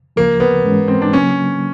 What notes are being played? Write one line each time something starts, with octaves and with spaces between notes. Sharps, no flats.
D2 C#3 F3 A#3
B3
G#2 E3 G#3 C#4
C4
D4
C#3 F#3 A#3 C#4